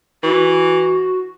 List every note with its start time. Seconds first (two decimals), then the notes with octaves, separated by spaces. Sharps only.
0.23 E3 F#4